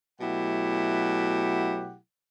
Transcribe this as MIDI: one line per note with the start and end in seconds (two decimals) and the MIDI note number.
0.21 1.97 47
0.21 1.97 54
0.21 1.97 57
0.21 1.97 64
0.21 1.97 67
0.21 1.97 78